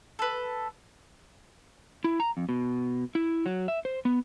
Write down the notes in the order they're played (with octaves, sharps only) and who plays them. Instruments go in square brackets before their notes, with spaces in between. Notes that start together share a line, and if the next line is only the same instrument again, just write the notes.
[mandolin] A4 B4
[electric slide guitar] E4
A#5
F2
B2
E4
F#3
E5
C5
B3